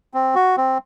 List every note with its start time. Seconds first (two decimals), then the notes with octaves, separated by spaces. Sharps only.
0.14 C4
0.35 F#4
0.57 C4